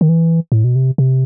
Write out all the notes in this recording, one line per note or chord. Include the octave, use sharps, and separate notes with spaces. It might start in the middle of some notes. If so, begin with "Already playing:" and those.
D#3
E3
A2
B2
C3
C3